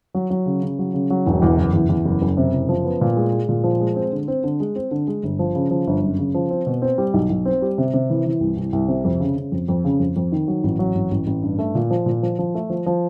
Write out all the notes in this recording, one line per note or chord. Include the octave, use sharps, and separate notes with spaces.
F#3
F#3
C#3
C#3
F#3
C#3
F#3
E1
E2
F#1
E2
E2
F#1
F#1
C3
F#1
F3
B3
A#2
G#3
G#3
A#2
F3
G#3
C4
D3
C4
D3
G#3
C4
D3
G#3
G1
F3
C#3
F3
G1
F#2
C#3
F3
C4
B2
C4
G3
B1
B1
C4
G3
C3
C3
E3
E3
C2
C2
C2
C3
F2
C#3
C#3
F2
F2
C#3
F2
F2
D#3
F#3
A1
F#3
A1
A1
A1
G2
A3
A#2
F3
A#2
F3
F3
A3
F3
F3